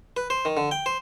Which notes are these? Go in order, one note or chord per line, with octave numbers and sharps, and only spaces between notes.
B4
C5
D#3
D3
G5
C5